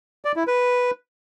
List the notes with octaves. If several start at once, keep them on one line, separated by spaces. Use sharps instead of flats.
D5
E4
B4